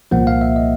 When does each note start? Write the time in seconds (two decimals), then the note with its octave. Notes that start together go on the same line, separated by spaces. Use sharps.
0.11 C2 A#2 F3 A#3 F#5
0.27 F5
0.41 E5
0.56 D#5